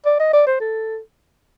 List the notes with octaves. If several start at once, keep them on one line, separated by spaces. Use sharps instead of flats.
D5
D#5
D5
C5
A4